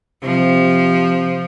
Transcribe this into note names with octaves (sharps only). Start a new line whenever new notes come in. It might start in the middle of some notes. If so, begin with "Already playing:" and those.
C3 F3